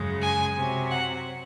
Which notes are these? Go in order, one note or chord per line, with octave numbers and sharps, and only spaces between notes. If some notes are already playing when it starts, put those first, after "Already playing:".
Already playing: F#2 C#3 G#3
G#5
C3 F#3
F#5